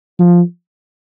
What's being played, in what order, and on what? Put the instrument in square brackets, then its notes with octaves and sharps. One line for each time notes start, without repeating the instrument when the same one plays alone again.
[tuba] F3